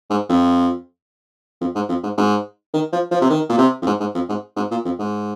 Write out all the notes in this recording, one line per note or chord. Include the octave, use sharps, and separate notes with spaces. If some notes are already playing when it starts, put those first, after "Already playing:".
G#2
F2
F2
G#2
F2
G#2
G#2
D#3
F3
F3
C3
D#3
A#2
C3
F2
G#2
G#2
F2
G#2
G#2
A#2
F2
G#2